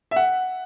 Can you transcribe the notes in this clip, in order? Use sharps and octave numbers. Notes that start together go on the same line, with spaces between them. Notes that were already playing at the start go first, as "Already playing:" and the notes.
E5
F#5